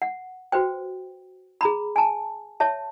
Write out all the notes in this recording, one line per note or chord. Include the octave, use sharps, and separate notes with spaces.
F#5
F#4 B4 C5 G5
G#4 A#5 B5
G#5 A5
C#5 E5 A5